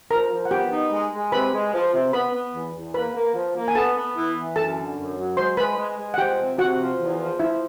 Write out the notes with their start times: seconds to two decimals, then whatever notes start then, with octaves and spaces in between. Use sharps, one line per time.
0.11 F3 A#4 A#5
0.31 F3
0.45 F#5
0.51 B3 G4 G5
0.71 D#4
0.91 G#3
1.13 G#3
1.32 C3 B4 B5
1.53 G#3
1.73 F3
1.94 C3
2.13 B3 B4 B5
2.33 B3
2.54 E2
2.74 E2
2.94 A#3 B4 B5
3.14 A#3
3.34 F3
3.56 A#3
3.68 G#5
3.75 B3 A4 A5
3.96 B3
4.16 E3
4.36 E3
4.56 F#2 A4 A5
4.77 D3
4.96 F#2
5.17 F#3
5.37 G#3 C5 C6
5.57 G#3 B4 B5
5.77 G#3
5.97 G#3
6.14 F#5
6.18 F3 G4 G5
6.39 C3
6.58 C3 F#4 F#5
6.79 F3
6.99 E2
7.19 F3
7.39 F3 E4 E5